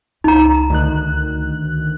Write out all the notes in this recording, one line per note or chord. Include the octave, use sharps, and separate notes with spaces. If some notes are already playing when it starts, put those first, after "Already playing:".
C#2 D#4 A#5
D2 D#3 F#6